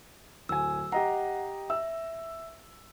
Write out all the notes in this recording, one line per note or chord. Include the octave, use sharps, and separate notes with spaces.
D1 G#5 E6
G4 D#5 F#5 A#5
E5 E6